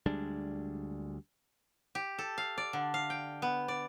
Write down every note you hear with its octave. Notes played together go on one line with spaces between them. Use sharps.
D2 G3 G#3 D4
G4
A4
F5
D5
D3
F5
G5
B3
D5